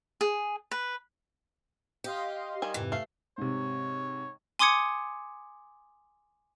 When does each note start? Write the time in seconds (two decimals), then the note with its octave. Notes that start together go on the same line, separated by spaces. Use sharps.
0.21 G#4
0.71 B4
2.04 G4 D#5 F5 C6
2.62 D#3 G3 G#5
2.74 F2 G#2 C3 E3
2.92 A3 F5
3.38 G#2 C3 C#5
4.59 G#5 C6 D6 D#6 G#6 C#7